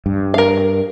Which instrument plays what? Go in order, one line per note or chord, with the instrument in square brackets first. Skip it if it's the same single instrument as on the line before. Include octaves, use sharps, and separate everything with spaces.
[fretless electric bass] G2
[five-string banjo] A#4 F5